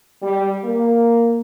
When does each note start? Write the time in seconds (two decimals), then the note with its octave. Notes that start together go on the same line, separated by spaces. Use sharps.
0.22 G3
0.64 A#3